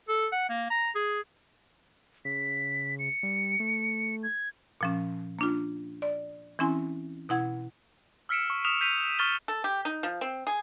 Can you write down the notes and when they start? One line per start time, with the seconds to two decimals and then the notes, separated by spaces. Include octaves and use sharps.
0.09 A4
0.32 F#5
0.49 A#3
0.70 A#5
0.95 G#4
2.25 C#3 B6
2.99 C#7
3.23 G3
3.60 A3
4.23 G#6
4.81 A#2 F3 C#4
5.39 A#3 D4 F4
6.02 D5
6.59 E3 C4 C#4 E4 G#5 C6
7.29 B2 E4 F#5 G#6
8.29 E6 F6 B6 C#7 D7 E7
8.50 C#6
8.65 D#6 F6 B6 E7 F7
8.81 G6 B6 D#7 F7
9.19 C#6 D#6 F6 A6 E7 G7
9.48 A4
9.64 G4
9.85 D#4
10.03 F3
10.21 C4
10.47 G#4